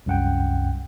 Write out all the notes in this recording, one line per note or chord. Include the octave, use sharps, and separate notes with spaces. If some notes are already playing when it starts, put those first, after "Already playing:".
C2 F#2 F#5 G5